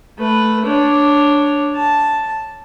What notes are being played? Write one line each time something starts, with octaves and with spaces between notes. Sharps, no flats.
A3 B4
D4 C#5
A5